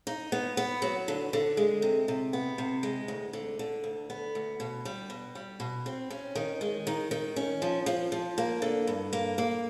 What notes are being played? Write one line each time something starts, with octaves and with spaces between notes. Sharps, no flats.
D#4
B3
B3
F#3
D3
D3
G#3
C3
C3
B3
C3
G#3
D2
D3
D3
D2
B3
D2
B2
G3
B2
G3
B2
C4
C#4
D#3
G#3
D#3
D#3
C#4
F3
F3
F3
A#3
D3
G2
A#3
A#3